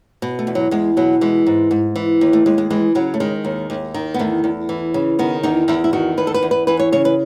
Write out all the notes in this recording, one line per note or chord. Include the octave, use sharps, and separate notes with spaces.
B2
A3
E2
F#3
E2 G#3
B2 F#3
E3 G#3
G#2
G#2
E3
D#2
A3
D#2 G#3
G#3
E3 G#3
C#3 F#3
A3
D#3 G#3
D#2
D#2
D#3
B3
E2 A3
E2
E3
C#3
D#3 B3
E2 D#4
E2 E4
E4
D#3 F#4
E2 B4
A4
B4
E2
B4
E3 B4
C#5
C#3 C#5
B4